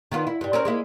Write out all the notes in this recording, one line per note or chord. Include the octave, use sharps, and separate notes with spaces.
D#3 B3 F4
E4
G2 G3
C4 C#4 A#4
G#3 A#3 E4